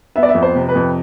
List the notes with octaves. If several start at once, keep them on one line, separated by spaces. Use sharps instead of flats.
B3 E5
D5
E5
F2
C5
C3
B4
F2